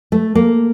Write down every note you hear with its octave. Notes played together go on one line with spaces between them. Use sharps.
A3
A#3